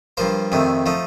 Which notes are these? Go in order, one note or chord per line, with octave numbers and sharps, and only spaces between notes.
G2 F3 A#3 C5
F2 C3 D#3 A3
F3 A3 D#4